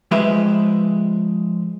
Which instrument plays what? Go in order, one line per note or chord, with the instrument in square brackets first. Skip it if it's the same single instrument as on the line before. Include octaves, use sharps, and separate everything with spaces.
[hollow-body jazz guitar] F3 G#3 G4 B4 C5 E5